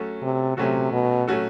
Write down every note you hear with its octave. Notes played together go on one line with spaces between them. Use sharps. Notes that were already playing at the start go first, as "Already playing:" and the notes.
Already playing: F#3 A3 C#4 F#4 A4
C3
C3 F#3 A3 C#4 F#4 A4
B2
F#3 A3 C#4 F#4 A4